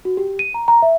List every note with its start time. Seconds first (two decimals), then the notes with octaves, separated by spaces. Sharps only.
0.05 F#4
0.17 G4
0.39 D#7
0.54 A#5
0.68 A#5
0.82 E5